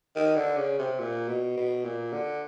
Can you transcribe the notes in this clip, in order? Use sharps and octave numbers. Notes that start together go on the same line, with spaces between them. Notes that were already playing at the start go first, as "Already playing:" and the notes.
D#3
D3
C#3
C3
A#2
B2
B2
A#2
D3